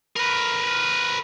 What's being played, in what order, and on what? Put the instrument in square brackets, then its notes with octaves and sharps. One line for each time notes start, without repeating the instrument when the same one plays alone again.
[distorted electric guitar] A#4 B4